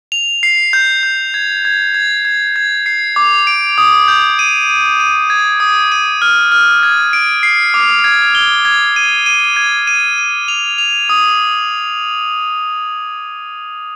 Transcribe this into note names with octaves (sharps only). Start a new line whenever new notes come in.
F7
C7
G6
G6
G#6
G#6
G#6
G#6
G#6
C7
D6
D7
D#6
G6
D#7
D#7
D#7
G#6
D#6
D#7
F6
F6
G#6
D7
C7
D6
G#6
G7
G#6
D#7
D#7
G#6
D#7
D#7
F7
F7
D#6